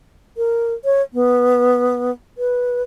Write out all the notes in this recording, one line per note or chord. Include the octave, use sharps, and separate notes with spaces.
A#4
C#5
B3
B4